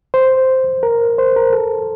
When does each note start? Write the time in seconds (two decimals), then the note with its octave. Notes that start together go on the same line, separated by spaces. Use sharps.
0.14 C5
0.83 A#4
1.18 C5
1.36 A#4
1.53 A4